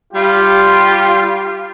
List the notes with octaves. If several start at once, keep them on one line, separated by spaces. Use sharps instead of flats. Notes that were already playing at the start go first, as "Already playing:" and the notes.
G3 F4 G4